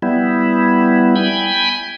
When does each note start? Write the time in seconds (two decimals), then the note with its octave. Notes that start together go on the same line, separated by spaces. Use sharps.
0.02 G3 B3 E4
1.16 G5 G#5 B5